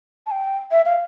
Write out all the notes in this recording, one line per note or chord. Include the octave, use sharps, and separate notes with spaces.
A5
G5
E5
F5